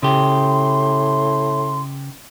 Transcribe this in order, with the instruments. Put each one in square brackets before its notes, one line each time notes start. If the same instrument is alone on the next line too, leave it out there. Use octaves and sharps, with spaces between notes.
[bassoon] A2 [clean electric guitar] C#3 G4 [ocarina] C6